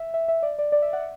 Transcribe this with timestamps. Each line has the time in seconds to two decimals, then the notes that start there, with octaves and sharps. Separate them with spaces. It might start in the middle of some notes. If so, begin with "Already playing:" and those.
Already playing: E5
0.14 E5
0.28 E5
0.43 D5
0.59 D5
0.72 D5
0.82 E5
0.93 D5 F#5